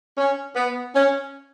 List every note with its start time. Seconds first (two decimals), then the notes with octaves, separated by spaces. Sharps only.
0.18 C#4
0.56 B3
0.95 C#4